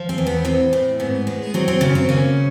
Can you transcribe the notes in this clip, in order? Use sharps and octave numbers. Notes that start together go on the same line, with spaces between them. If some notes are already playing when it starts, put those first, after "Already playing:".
Already playing: F3
C4
E2
B3
A2 C4
A2
G#2 B3
G#3
F#3 C4
C4
F#2 C#3 C#4
C4
C#3 A#3 C#4